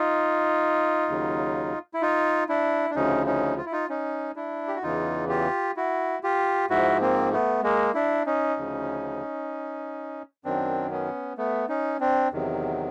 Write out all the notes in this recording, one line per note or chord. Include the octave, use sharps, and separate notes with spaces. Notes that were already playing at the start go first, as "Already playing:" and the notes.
Already playing: D#4 F4
D#2 C#3 F#3
E4
D#4 F4
D4 E4
D4
D2 C#3 F3 C#4 D#4
C#4 D#4
F4
E4
D#4 F4
C#4 D#4
D4 E4
G4
F#4
E2 C#3 E3 D#4 F4
F4 G4
E4 F#4
F4 G4
G#2 F3 E4 F#4
A#3 C4
A3 B3
G#3 A#3
D4 E4
C#4 D#4
D2 C#3 F3
F#2 D#3 F#3 C4 D4
B3 C#4
A3 B3
C#4 D#4
C4 D4
E2 C3 D#3 F#3